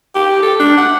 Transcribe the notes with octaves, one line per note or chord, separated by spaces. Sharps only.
G4
A4
D4
F#5